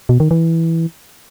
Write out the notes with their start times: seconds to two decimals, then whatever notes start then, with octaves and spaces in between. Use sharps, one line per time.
0.09 B2
0.20 D#3
0.31 E3